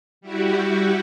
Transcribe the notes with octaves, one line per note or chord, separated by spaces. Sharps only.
G3 E4 F#4 G4